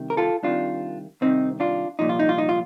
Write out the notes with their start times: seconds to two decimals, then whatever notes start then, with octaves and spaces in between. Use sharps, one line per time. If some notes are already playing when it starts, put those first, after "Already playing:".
Already playing: C2 C3 D#3
0.10 A#4
0.17 F4 A4
0.43 C2 C3 D#3 D4 F4
1.21 C2 C3 D#3 C4 D#4
1.60 D4 F4
1.99 C2 A#2 F3 D#4
2.09 F4
2.19 D#4
2.29 F4
2.38 D#4
2.49 F4